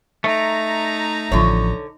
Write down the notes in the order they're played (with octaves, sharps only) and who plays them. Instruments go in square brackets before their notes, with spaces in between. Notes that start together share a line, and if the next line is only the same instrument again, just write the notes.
[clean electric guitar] A3 [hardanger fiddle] D#4 A#5
[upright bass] A1 F3 [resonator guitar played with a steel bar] D3 C#5